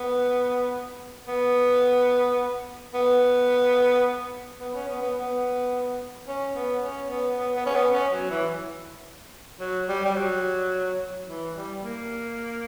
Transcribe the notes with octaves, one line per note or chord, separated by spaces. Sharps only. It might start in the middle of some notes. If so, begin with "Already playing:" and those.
Already playing: B3
B3
B3
B3
C#4
B3
B3
B3
C#4
B3
C#4
B3
B3
B3
C#4
B3
C#4
F#3
E3
F#3
G3
G3
F#3
E3
G3
A#3